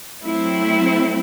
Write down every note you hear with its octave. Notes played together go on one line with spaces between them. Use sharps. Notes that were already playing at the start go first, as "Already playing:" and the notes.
F#3 A3 C4 E4